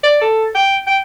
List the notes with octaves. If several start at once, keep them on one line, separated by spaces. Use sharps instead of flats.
D5
A4
G5
G5